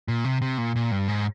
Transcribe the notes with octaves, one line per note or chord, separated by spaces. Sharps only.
A#2
C3
C3
A#2
A#2
G2
G#2